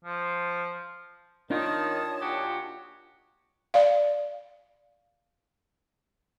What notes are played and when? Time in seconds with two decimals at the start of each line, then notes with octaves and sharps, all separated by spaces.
0.04 F3
1.51 D#3 D4 D#4 F4 C#5 A5 D#6
2.22 A#2 F#4 G4
3.74 D5 F5